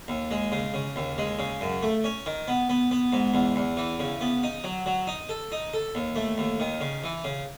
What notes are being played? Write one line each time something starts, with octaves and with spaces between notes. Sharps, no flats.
D#2
G#3
C#3
C#3
D#2
G#3
C#3
F#2
A3
C#4
D#3
B3
B3
B3
G#2
E2
E2
E3
C#3
B3
D#4
F#3
F#3
D#4
A4
D#4
A4
D#2
A3
D#2
D#3
C#3
E3
C#3